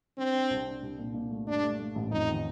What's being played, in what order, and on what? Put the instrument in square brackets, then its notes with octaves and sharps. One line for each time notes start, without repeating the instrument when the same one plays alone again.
[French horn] C4 [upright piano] D4
[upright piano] D4
C2
D4
C2
A#2
A#2
A3
[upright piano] G2 [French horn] D4
[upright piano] A3
A3
A1
[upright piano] F2 [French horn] D#4
[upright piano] D#3